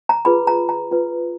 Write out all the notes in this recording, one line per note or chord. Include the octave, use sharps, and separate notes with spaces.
A#5
F4 G#4 B4 B5
A#5
A#5
F4 B4